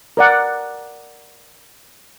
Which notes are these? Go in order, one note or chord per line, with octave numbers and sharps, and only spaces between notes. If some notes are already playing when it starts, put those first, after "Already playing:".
A#4 D5 F#5